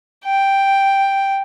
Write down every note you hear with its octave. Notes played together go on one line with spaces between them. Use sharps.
G5